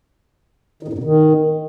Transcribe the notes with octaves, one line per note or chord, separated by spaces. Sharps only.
D#3
A2
G2
B2
D#3